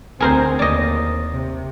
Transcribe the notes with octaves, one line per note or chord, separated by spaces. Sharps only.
D2 C4 G#4 A#4 C5
D#2 D5 D#5
C3